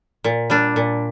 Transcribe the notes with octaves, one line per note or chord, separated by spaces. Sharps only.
A#2
G3 D4
A#2